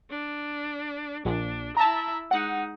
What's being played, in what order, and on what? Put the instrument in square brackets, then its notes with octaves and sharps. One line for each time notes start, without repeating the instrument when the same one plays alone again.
[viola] D4
[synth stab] A#1 [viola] D4
[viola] E4 E5 [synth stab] A5 A#5
[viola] G#3 D#4 [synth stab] F#5